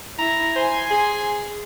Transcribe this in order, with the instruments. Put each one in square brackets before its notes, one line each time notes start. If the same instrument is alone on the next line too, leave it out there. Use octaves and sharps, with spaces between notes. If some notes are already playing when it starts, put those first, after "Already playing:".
[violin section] E4 [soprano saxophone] A#5
[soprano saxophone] C5 [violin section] G#5 C6
[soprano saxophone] G#4